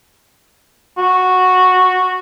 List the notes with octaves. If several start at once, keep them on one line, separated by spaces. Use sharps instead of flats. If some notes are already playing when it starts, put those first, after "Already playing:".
F#4